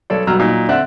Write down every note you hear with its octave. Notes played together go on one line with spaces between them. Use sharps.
B1 A4 C#5 D5
G2 B2 F#3 A#5 E6 F6
A#2 F#3 D#4
D3 C4 D5 E5 F#5 F#6